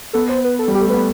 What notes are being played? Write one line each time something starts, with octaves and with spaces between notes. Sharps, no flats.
B3 A4
C5
B4
A4
G3
G4
A3
B3 B4